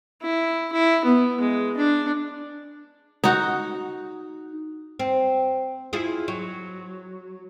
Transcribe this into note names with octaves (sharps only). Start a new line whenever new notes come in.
E4
E4
B3
G#3
D4
D#4 F#4
C4
E4 F4 G#4
F#3